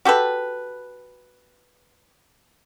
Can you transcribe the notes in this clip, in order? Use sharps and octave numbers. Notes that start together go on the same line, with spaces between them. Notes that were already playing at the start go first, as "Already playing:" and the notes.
F#4 G4 A4 B4